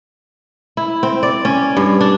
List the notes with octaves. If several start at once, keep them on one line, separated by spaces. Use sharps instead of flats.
E4
C4
D5
C#4
G2
D4